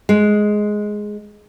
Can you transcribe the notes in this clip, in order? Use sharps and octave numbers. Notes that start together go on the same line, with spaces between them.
G#3